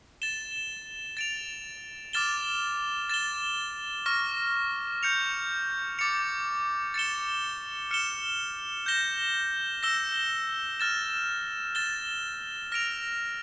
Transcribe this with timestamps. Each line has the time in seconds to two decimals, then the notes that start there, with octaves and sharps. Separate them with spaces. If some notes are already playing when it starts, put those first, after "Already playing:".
0.22 A6 E7 G7
1.17 A6 D7 F7
2.13 D6 F6 A6 E7 G7
3.10 A6 E7 G7
4.06 C#6 F6 A#6
5.03 G6 C#7 F7
5.99 D6 A6 C#7 F7
6.94 A6 C#7 E7 G7
7.91 F6 C#7 E7 G7
8.86 G6 A#6 E7 G7
9.83 E6 A#6 E7 G7
10.80 F6 A6 E7
11.75 A6 E7 G7
12.72 F6 A#6 D7 F7